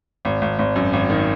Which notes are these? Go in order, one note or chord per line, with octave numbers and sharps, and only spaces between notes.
G#1
G#1
G#1
F#2
G#1
D#3